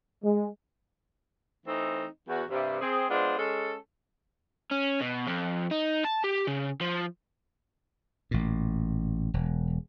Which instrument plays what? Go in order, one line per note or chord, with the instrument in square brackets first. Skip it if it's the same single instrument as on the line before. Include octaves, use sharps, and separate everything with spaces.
[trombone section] G#3
[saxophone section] E3 A3 C4 D#4
E2 F#4
G2 C3
C4 G#4
G#3 B3 D4 F4 C5
G#3 C#4 A4
[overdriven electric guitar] C#4
B2
F2
D#4
A5
G4
C#3
F3
[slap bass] A1 A#2
E1